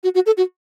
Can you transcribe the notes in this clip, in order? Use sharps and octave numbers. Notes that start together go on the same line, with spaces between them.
F#4
F#4
A4
F#4